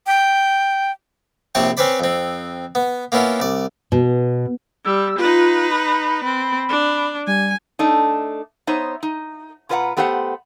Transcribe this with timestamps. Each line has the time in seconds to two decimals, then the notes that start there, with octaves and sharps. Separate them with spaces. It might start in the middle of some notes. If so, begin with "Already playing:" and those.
0.07 G5
1.55 A#1 C3 C4 C#5 A5
1.77 C4 C#4 B4 C5 D5 B5
2.00 F2 C4
2.75 B3
3.12 A#3 B3 C#4 E4 F4
3.40 C2 D5
3.92 B2
4.85 G3 E6
5.19 D#4 F4 B4
5.71 B5
6.24 C4
6.69 D4
7.27 G3 G#5
7.79 A3 D4 D#4
8.67 B3 D#4 C5 C#5 E5
9.03 D#4
9.69 B2 F4 B4 C5 F#5 A#5
9.97 A3 B3 G4 C5 F5 F#5